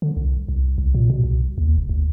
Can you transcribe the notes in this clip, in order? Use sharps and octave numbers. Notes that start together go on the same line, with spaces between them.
D3
C2
C2
C2
A#2
B2
C2
D#2
F1
D2